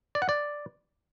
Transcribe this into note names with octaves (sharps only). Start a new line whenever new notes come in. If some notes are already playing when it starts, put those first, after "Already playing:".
D5
F#5
D5